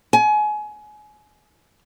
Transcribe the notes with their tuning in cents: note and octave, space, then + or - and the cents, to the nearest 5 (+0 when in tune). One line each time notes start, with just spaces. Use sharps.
G#5 +30